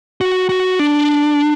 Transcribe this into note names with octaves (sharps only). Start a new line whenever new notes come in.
F#4
F#4
D4